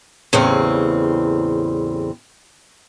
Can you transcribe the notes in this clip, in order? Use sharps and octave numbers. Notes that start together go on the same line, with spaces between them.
E2 A2 C#3 G3 C4